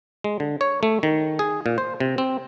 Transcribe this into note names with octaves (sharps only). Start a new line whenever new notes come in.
G#3
D3
C#5
A3
D#3
G#4
A#2
C5
C3
C4